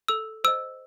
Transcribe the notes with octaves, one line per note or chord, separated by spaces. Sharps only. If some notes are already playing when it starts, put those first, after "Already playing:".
A4 E6
C5 D#5 E6